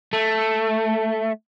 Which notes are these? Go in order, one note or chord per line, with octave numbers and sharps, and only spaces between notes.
A3